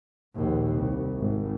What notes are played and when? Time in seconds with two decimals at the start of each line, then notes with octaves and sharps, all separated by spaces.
0.35 A#1 D#2
0.74 C2
1.19 G#1